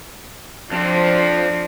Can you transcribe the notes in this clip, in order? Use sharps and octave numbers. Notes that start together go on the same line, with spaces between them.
F2 F3 C4 D4